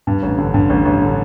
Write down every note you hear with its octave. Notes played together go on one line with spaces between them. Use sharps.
G2
A1
D3
G2
A1
A1
D3